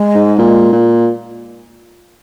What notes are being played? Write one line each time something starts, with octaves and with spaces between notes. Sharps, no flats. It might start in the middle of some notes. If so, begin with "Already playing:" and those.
Already playing: G#3
G#2
A#2
A#2